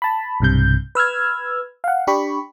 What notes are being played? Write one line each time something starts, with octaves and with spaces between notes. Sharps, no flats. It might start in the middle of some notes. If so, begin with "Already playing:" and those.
A5 B5
B1 G2 C3 G6
B4 E6 F6 G#6
F5 F#5
D4 G4 B5 C#6